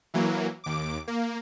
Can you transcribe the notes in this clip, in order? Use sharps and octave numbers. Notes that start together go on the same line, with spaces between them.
E3 F#3 A#3
D#2 D6
A#3